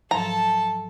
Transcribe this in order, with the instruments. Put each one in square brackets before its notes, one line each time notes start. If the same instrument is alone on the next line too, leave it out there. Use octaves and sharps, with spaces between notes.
[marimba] G#2 F3 F#3 [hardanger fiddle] A4 A5 [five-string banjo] A#5